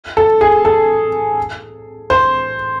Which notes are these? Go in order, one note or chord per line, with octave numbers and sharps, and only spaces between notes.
A4
G#4
A4
C5